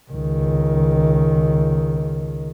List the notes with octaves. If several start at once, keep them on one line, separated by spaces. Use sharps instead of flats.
C#2 D#3